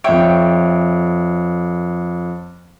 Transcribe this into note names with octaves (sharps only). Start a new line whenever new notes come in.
F2 C#5 E5 G5 D7